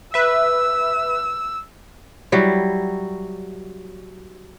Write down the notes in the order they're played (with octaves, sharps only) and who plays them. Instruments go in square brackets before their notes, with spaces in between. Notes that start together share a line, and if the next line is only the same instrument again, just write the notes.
[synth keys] B4 E5 [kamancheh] E6
[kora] F#3 G3 E4